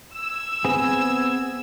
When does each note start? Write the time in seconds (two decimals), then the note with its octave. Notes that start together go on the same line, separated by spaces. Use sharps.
0.15 E6 G#6
0.65 B3 C4 G#4